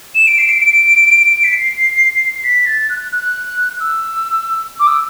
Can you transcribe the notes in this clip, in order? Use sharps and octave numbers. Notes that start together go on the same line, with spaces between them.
E7
D7
C7
D7
D7
B6
C7
B6
A6
F#6
F#6
E6
D6
E6